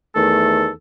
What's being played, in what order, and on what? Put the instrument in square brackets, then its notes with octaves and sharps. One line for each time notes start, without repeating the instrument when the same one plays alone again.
[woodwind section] E2 D#3 A3 A4